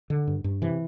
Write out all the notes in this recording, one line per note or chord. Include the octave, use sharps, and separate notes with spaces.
D3
G2
G2
C3 E3